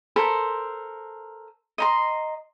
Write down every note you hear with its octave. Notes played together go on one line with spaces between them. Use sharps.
A4 A#4 C5 B5
D#5 A#5 C6